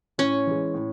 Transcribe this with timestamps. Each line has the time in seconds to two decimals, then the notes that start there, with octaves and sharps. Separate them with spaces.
0.18 A2 C#4
0.47 E3 G#3
0.74 A2